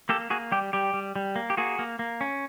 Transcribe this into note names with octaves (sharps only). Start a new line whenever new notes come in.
A#3 G4 A4
A#3 F#4 G#4
G3 G4
G3 G4
G3
G3
A#3
G4
A#3 F#4 G#4
A#3
A#3
C#4